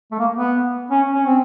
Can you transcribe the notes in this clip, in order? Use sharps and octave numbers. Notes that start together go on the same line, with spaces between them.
A3
A#3
B3
C#4
C#4
C4